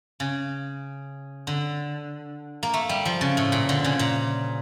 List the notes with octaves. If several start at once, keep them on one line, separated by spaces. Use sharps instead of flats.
C#3
D3
A#3
A3
G3
F3
C#3
A2
A#2
D3
C#3
A#2